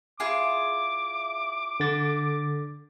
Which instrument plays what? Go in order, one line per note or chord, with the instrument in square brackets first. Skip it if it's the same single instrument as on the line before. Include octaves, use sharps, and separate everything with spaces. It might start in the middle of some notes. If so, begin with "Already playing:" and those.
[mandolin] E4 F4 G#4 [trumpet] D6
[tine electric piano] D3 A6